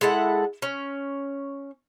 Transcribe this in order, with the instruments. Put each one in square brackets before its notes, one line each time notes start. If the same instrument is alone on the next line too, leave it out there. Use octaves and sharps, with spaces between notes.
[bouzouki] G#3 E4 A4 F#5
C#4